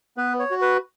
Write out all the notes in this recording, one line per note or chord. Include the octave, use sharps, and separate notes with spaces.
B3 B4
C#5
F#4
B4